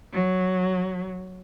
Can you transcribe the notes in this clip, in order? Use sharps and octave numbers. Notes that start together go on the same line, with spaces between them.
F#3